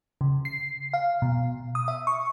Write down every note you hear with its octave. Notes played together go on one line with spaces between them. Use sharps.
C#3
C7
F5
B2
D#6
E5
C#6